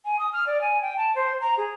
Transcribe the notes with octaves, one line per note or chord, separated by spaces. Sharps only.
G#5
D#6
F6
D5
G#5
G5
A5
C5
A#5
G#4